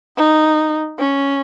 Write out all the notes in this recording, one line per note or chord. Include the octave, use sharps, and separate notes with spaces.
D#4
C#4